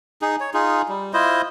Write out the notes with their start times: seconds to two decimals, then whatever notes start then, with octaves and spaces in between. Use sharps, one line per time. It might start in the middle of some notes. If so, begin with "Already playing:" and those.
0.22 D#4 G#4
0.40 C#5
0.54 D#4 F4 G#4
0.89 G3
1.14 E4 F4 C5 D#5